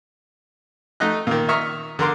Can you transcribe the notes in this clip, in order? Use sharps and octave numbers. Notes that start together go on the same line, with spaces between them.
A3 D#4 D#5 F#6
A#2 D#3
E5 A#5 C#6 D#6 F6
D3 A#4 C6 D6